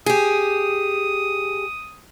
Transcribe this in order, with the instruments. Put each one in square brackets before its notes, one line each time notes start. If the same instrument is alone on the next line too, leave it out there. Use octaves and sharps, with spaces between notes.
[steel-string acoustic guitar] G4 G#4 [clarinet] D#6